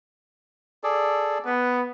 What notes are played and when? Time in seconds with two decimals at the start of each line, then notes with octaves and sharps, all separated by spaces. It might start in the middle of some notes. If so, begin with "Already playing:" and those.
0.83 G#4 A4 D5
1.46 B3 B4